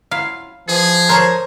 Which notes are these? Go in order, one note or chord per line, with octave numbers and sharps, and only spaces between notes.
F#3 E4 F4 F5
E3 F3 G#4
A4 A#4 C5 C#5